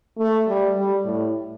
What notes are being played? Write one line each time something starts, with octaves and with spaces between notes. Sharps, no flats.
A3
G3
G3
A2